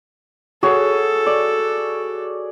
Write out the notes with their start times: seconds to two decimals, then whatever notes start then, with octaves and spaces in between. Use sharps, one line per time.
0.63 F#4 G#4 A4 C#5
1.26 D5